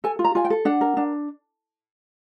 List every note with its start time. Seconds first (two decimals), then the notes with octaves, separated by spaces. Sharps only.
0.04 A4 G#5
0.19 F4
0.24 A#5
0.35 F4 G#5
0.45 G5
0.50 A4
0.65 D4 F#5
0.81 A#4
0.97 D4